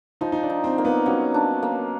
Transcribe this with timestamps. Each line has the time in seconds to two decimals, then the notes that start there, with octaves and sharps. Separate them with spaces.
0.21 F3 D#4
0.32 D#4
0.43 D4
0.50 D#4
0.64 C4
0.78 A#3
0.85 B3
1.06 F#3 C#4
1.34 D4
1.63 A#3